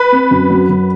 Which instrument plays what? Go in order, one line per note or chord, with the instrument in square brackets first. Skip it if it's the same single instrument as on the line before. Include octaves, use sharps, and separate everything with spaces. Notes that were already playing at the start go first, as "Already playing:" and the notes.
Already playing: [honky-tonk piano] B4
[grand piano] C4
F#2
F#3
F#2